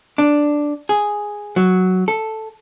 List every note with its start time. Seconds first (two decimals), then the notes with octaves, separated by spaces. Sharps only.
0.18 D4
0.89 G#4
1.56 F#3
2.08 A4